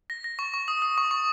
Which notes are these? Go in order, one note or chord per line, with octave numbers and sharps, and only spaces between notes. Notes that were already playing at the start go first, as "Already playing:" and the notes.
A#6
A#6
C#6
C#6
D#6
D#6
C#6
C#6